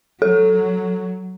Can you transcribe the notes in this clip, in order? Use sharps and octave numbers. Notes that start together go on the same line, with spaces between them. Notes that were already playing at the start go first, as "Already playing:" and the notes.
F#3 A4